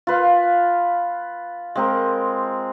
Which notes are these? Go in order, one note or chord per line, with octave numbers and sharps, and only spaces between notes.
F4 B4 F5
G#3 C4 A#4